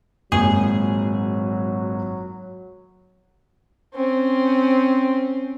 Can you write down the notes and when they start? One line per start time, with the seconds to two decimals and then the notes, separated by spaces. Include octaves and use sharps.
0.32 G#1 A#2 F#3 G#4
3.94 C4 C#4